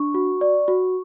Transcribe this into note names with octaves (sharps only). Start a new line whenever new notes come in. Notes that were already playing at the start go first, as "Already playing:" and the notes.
Already playing: D4 C#6
F#4
D5
F#4